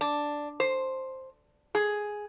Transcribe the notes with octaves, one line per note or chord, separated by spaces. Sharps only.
D4
C5
G#4